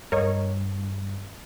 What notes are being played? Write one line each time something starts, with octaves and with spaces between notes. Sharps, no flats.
G2 A#4 C#5 D#5